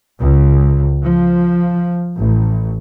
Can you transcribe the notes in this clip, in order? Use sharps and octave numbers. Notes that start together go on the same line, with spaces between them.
C#2
F3
A1